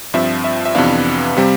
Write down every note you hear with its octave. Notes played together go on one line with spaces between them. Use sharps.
G2 F3 C4 E5
E5
E5
F2 C3 E3 B3 D4 F5
C3 G3 C4